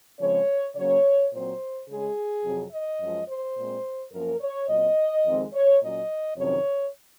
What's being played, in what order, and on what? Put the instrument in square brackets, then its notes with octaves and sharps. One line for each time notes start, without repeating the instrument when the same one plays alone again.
[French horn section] C#3 F3 G#3 C4 C#5
C#3 F#3 A#3 C#4 C#5
A#2 F#3 C4 C5
C#3 G#3 C#4 G#4
F2 C3 F#3 C4
D#5
F#2 F3 G#3
C5
A#2 G#3 C4
F#2 F3 A#3 C#4 A#4
C#5
A#2 F#3 C4 D#5
F2 D#3 G#3 C4
C#5
A#2 F#3 C#4 D#5
F2 C3 D#3 F#3 C#4 C#5